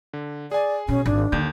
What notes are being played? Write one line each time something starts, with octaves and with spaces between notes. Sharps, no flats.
D3
G#4 D5 G#5
B2 C#4
G#1 D4
D#2 D3 G6